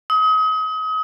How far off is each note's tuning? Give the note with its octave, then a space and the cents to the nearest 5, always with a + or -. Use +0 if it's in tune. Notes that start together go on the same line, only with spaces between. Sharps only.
D#6 +35